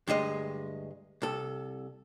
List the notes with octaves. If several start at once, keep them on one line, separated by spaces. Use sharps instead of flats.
D2 G2 G#3 D#5
C2 A4